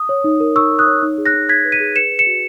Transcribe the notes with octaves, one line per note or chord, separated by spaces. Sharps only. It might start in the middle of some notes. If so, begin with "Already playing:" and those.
Already playing: D#6
C#5
D#4
A#4
D#4 C#6 E6
A#4
D#6 F#6
C#5
D#4
G#4
F#6 A#6
D#4
G#4 G#6 B6
B4
B6 D#7
G#4
B4 C#7 E7
B4
C#7 E7
F#4